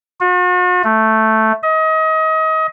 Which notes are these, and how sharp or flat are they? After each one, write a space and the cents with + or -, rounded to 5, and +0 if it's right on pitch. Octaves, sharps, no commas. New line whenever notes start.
F#4 -45
A3 +0
D#5 +30